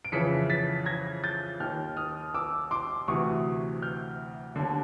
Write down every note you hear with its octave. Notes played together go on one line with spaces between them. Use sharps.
D7
F2 C#3 E3 B6 C#7
A6 B6
G#6 A#6
G6 A6
D#2 D#3 F6 G6
D#6 F6
D6 E6
C6 D6
D2 C3 E3 C#6 D#6
F6 G6
D#2 D3